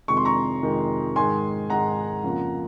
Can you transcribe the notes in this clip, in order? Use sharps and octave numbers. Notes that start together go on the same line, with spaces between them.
F2 C3 D#3 G#3 C#6
C6
A#5 C#6
F2 C3 D#3 G#3
G#2 D#3 G#3 G#5 C6
G#2 D#3 G#3 F#5 A#5
F2 C#3 F3 A#3